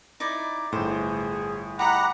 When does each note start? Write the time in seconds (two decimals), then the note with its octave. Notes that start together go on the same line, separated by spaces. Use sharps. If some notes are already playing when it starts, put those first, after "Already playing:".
0.20 D#4 E4 D5
0.72 G1 A2 G#4 C5
1.79 G4 D#5 F#5 A#5 B5